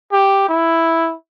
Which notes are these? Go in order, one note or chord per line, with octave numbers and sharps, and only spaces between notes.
G4
E4